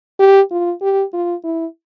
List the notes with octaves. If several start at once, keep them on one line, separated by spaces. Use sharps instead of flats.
G4
F4
G4
F4
E4